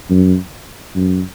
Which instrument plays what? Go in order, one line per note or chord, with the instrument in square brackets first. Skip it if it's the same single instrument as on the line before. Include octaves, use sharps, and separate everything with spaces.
[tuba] F#2
F#2